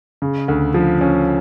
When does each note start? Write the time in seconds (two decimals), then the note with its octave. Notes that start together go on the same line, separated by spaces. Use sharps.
0.22 C#3
0.48 D2
0.74 F3
1.01 C#4